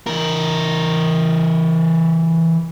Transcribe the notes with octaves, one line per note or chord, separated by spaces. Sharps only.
E3 A#4